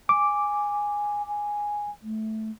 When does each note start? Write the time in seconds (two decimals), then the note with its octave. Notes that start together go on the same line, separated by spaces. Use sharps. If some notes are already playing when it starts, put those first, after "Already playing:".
0.09 G#5 D6
1.27 G#5
2.03 A3